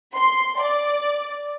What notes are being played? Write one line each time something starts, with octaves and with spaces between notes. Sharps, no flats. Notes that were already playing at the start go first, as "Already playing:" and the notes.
C6
D5